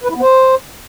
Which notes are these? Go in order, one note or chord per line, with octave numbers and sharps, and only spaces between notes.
B4
E4
B3
C5